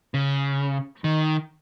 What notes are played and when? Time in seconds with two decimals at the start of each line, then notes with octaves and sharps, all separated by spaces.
0.14 C#3
1.04 D#3